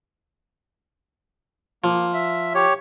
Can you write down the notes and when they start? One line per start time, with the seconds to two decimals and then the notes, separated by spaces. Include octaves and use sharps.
1.84 F3 A#3
2.14 E5
2.55 G4 C#5